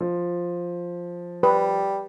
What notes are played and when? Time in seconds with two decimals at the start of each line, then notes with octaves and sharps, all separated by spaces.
0.01 F3
1.43 G3 B4